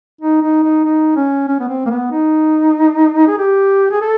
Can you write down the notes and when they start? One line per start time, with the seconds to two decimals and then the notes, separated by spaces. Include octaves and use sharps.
0.21 D#4
0.42 D#4
0.63 D#4
0.84 D#4
1.16 C#4
1.48 C#4
1.60 B3
1.69 C4
1.86 A#3
1.90 B3
2.11 D#4
3.28 G#4
3.38 G4
3.91 G#4
4.01 A4